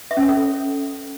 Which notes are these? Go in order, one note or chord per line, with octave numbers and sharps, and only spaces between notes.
E5
C#4
C#5
A4